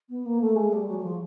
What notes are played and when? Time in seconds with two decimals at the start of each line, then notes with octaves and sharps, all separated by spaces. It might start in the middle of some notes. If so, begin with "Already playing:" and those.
0.10 B3
0.26 A#3
0.41 A3
0.56 G#3
0.73 G3
0.87 F#3
0.98 F#3
1.03 F3